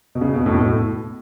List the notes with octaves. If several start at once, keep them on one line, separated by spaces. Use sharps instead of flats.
B2
C#3
B2
A2
B2
A2